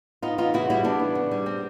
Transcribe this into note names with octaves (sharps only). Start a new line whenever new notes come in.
B3 D#4 F4
E3 D#4 F4
C#3 E4 F#4
G3 E4 F#4
B3 D4
E3
C#3
G3
C4